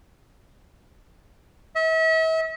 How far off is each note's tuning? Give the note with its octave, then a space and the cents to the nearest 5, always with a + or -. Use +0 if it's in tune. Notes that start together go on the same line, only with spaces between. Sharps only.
E5 -40